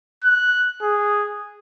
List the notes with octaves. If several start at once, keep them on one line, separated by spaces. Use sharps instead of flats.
F#6
G#4